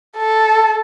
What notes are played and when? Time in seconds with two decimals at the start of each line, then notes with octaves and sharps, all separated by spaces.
0.17 A4